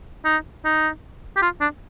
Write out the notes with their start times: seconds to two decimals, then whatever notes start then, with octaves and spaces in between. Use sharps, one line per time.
0.25 D#4
0.65 D#4
1.37 G4
1.42 F4
1.61 D4